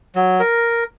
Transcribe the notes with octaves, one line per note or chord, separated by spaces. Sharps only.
F#3
A#4